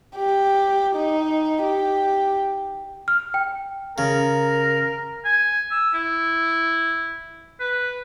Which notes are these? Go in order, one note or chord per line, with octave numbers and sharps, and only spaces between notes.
G4
D#4
G4
F6
G5
C#3 A#4
G#5
E6
E4
B4